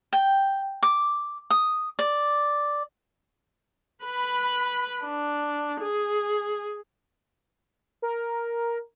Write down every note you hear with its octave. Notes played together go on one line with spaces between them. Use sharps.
G5
D6
D#6
D5
B4 B5
D4
G#4
A#4